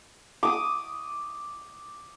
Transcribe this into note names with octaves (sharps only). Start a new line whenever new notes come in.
D6 D#6